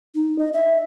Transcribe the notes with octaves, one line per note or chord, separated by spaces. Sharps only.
D#4
D#5
E5